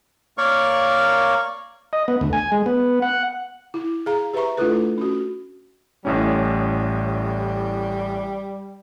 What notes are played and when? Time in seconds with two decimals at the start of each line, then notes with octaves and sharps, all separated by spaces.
0.38 A#3 A#4 C#5 D5 F5 C#6
1.93 D#5
2.08 B3
2.21 D2
2.33 G#5
2.52 G#3
2.66 B3
3.02 F#5
3.74 E4
4.06 G#4 F5 A#5
4.33 G4 B4 C5 E5 A#5 C#6
4.57 A3 D4 E4 F4 A4 B4
4.98 C#4 F#4
6.05 A1 A2 G3 C#4